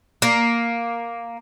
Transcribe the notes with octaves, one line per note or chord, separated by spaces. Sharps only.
A#3